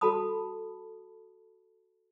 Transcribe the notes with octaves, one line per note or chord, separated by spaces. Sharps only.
F#4 A4 A5 B5 D#6